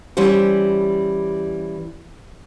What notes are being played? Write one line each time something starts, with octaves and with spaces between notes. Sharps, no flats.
E3 G3 C#4 C5